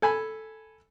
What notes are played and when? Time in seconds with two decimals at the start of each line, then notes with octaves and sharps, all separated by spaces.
0.02 A4 G#5 B5